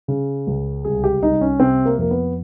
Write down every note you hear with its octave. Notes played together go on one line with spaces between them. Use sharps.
C#3
C#2
C2 G#4
G4
C2 D#4
C#4
C3 C4
A#3
F2 A#3
B3